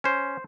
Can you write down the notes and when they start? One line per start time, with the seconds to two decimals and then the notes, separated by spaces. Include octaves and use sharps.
0.04 C#4 C5